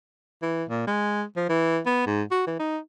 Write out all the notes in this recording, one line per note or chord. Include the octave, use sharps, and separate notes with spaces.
E3
A#2
G#3
F3
E3
B3
G#2
F#4
E3
D#4